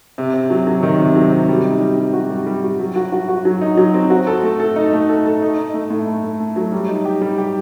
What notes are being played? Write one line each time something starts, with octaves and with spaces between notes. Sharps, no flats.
C3
C3
F#3
F#3
D#3
C3
F#3
C3
G3
D#4
G3
G3
F#4
G3
G3
F#4
F#3
F#4
F#4
F#4
F#3
D#4
F#3
C4
F#4
A4
A3
A4
D#4
A3
A4
A4
D#4
D#4
A3
A2
A3
A3
A3
F#3
G3
D#4
G4
G3
G4